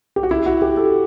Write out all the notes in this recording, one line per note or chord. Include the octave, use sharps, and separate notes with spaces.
G4
F#4
E4
F#4
G4
A4